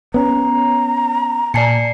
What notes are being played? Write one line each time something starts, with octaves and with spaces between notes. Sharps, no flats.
B3 C#4 A#5
A#2 D5 G#5 A5 C7 C#7